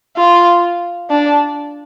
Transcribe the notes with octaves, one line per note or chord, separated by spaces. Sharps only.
F4
D4